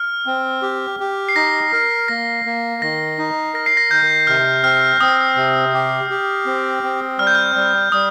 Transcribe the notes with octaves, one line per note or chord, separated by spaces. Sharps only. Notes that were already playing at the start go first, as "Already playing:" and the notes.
Already playing: F6
C4
G4
G4
C7
D#4 A#6
A#4
A#3 A#6
A#3
D#3 A#6
D#4
A#4 A#6
C7
A#6
D#3 G6
C3 F6
C4 F6
C4 D#6
C3
G4
G4
C4
C4
G3 F6
G6
F6
G3
G3 D#6